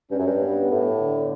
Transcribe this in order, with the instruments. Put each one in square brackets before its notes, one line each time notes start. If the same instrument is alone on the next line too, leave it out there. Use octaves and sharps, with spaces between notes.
[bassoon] G2 [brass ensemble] C#4
[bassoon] F#2
G2
[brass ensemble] B3
[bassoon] A2
[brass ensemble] D3